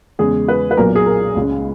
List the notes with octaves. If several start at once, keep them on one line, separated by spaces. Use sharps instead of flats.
E2 C#3 G#3 G#4
B4
B4
B1 A#2 F#3 A#4
G#4
A#4
C#2 C#3 G#3